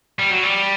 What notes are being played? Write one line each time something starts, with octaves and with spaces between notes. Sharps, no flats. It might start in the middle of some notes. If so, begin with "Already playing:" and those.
G3
F#3
G3